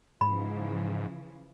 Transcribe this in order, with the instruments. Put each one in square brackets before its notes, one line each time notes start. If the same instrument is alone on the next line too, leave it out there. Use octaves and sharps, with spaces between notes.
[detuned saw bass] G#2 [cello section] C#3 E3 F3 [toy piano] B5